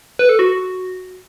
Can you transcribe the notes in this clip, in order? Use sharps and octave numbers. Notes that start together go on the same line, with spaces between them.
B4
A4
F#4